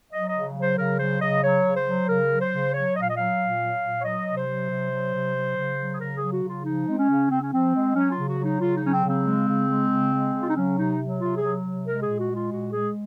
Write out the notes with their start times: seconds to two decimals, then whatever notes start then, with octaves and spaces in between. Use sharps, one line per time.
0.13 F#3 D#5
0.29 D#5
0.34 C#3
0.56 F#3
0.61 C5
0.78 C#3 A#4
0.99 F#3 C5
1.21 C#3 D#5
1.43 F#3 C#5
1.65 C#3
1.76 C5
1.86 F#3
2.09 C#3 A#4
2.30 F#3
2.41 C5
2.52 C#3
2.74 F#3 C#5
2.95 A#2 D#5
3.02 F5
3.10 D#5
3.16 F#3 F5
3.39 A#2
3.60 F#3
3.82 A#2
3.99 C#5
4.03 F#3 D#5
4.26 C3
4.37 C5
4.47 F#3
4.69 C3
4.91 F#3
5.13 C3
5.35 F#3
5.57 C#3
5.77 F#3
5.94 G#4
6.00 C#3 A#4
6.16 G#4
6.22 F#3
6.33 F#4
6.43 C#3
6.49 F4
6.64 F3 D#4
6.87 G#3 C4
6.98 C#4
7.09 C#3
7.30 C#3 C4
7.42 C#4
7.52 F3 C4
7.74 G#3
7.95 F#3 C#4
8.11 F4
8.17 C#3
8.28 F#4
8.38 F#3
8.44 D#4
8.61 C#3 F4
8.77 D#4
8.82 F#3 C#4
8.92 C4
9.04 C#3 C4
9.25 G#3
9.48 C#3
9.68 G#3
9.91 C#3
10.12 G#3
10.34 C#3
10.42 F4
10.49 D#4
10.56 F#3 C#4
10.78 C3 D#4
10.99 F#3
11.21 C3 F4
11.37 G#4
11.42 F#3
11.64 C3
11.86 G#3 A#4
12.02 G#4
12.07 A#2
12.19 F#4
12.30 G#3
12.36 F4
12.51 A#2 F#4
12.73 G#3 G#4